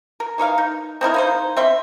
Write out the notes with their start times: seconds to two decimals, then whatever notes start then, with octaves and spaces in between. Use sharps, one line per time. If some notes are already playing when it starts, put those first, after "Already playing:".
0.20 A#4
0.38 E3 D#4 A#4 F5
0.58 D#4
1.01 C4 D#4 E4 A#4
1.14 A#3 D#4 C5
1.57 C4 E5 C6